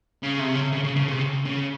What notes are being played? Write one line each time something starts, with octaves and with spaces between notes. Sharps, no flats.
C#3
C3
C#3
C#3
C#3
C#3
C3
C#3
C#3